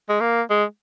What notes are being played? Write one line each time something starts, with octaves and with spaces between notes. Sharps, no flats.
G#3
A#3
G#3